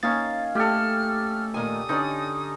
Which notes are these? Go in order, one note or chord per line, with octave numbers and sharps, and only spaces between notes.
A#3 C#4 D#4 F5 A6
A3 G4 A4 F6
A#2 D#3 G#5 D#6
D3 C#4 D#4 G4 D5